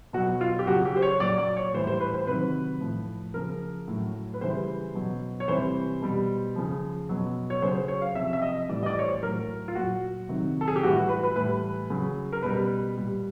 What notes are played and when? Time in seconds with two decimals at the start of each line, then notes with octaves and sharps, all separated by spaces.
0.13 B2 F#3 F#4
0.41 F4
0.59 G4
0.67 C#3 F#3 F#4
0.85 G4
0.96 C5
1.02 C#5
1.20 A#2 F#3 D5
1.38 D5
1.56 C#5
1.74 A2 E3 G3 C5
1.87 C5
2.01 B4
2.14 C5
2.27 C3 D#3 F#3 B4
2.81 A2 F3
3.34 C#3 F3 A#4
3.88 A2 F#3
4.34 B4
4.41 C#3 E3 G3 C5
4.95 B2 F#3
5.40 C#5
5.48 C3 E3 G3 C5
6.02 B2 G3
6.56 C#3 F3
7.09 B2 F#3
7.50 C#5
7.62 C#3 F#3 C5
7.75 C5
7.88 C#5
8.02 F5
8.15 C3 F3 E5
8.33 E5
8.42 D#5
8.69 A2 E3 G3 D5
8.83 D#5
8.86 D5
8.99 C#5
9.04 C5
9.22 A2 F#3 A#4
9.68 F4
9.75 A#2 F#3 F#4
10.29 C3 D#3 F#3
10.61 A4
10.68 G#4
10.76 G4
10.83 A2 E3 G3 F#4
10.96 F#4
11.09 B4
11.23 B4
11.36 A2 E3 G3 B4
11.90 C#3 F#3
12.33 A#4
12.42 B2 G3 B4
12.97 A#2 G3